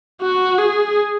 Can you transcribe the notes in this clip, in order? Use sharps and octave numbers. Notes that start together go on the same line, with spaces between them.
F#4
G#4